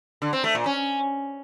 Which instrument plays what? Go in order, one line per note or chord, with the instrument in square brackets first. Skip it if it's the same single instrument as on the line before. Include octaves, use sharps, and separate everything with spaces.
[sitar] D3
C4
A3
A#2
C#4